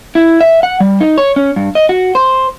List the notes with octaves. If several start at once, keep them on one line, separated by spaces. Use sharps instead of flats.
E4
E5
F#5
G3
D#4
C#5
C#4
G2
D#5
F#4
C5